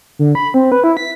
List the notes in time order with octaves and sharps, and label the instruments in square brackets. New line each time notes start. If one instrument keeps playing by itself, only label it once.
[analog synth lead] D3
B5
C4
B4
E4
B6